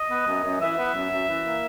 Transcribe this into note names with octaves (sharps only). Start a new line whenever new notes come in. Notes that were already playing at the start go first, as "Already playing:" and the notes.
Already playing: D#5
B3
F#2
F#2
E3 E5
B3
F#2
F#2
E3
A#3